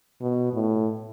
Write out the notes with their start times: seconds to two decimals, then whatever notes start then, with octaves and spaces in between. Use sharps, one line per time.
0.21 B2
0.53 A2